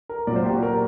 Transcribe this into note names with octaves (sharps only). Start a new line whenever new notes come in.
A#4
A#2 F#3 D5
C5
G4
F#4
A#4